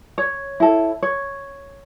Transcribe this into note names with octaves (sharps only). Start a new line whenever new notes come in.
C#5
E4 A4
C#5